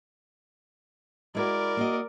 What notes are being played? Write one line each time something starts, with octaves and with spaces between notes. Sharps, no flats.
G#3 E4 F#4 A#4 D5
A#3 F#4 D#5